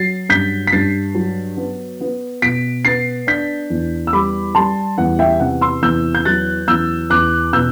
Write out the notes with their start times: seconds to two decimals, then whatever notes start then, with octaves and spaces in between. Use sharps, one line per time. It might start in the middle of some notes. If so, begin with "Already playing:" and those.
Already playing: F#3 A6 C7
0.29 G2 G6 B6
0.67 B6
0.73 G2 A6 C7
1.15 F#3
1.57 B3
2.01 B3
2.42 B2 B6 D7
2.85 B3 A6 C7
3.27 D4 G6 B6
3.70 E2
4.07 E6
4.13 G3 B5 D6
4.55 G3 A5 C6
4.98 E2 F#5
5.19 E5 G5
5.40 C3 F#5
5.61 C6 E6
5.82 E2 E6 G6
6.15 G6
6.25 F#3 F#6 A6
6.68 E2 E6 G6
7.10 E2 D6 F#6
7.53 B2 E6 G6